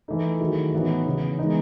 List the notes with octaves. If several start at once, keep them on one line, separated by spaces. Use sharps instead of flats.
E3 A3 D#4 A4
D#3 F#3 A3 E4 G#4
A2 E3 B3 D#4 F#4
C#3 E3 B3 F#4
E3 G#3 B3 D#4